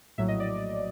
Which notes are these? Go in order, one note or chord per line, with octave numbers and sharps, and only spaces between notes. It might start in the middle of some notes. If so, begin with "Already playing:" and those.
A#1 A2 F#3 E5
D#5
D5